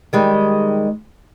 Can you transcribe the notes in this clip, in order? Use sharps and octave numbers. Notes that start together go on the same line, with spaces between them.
D#3 G3 G#3